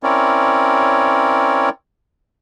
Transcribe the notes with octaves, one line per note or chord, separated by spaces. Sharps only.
C4 C#4 E4 A#4 C#5 D5